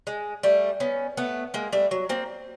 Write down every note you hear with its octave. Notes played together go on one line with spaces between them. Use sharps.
G#3
G3 A3
B3 C#4
A3 B3
G#3 A#3
G3 A3
F#3
A#3 C4